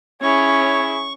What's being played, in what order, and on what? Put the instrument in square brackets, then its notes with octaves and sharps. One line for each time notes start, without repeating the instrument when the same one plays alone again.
[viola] C#4 [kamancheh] E4 G#4 [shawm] C#5 [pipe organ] C#6